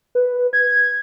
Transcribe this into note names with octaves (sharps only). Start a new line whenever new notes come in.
B4
G#6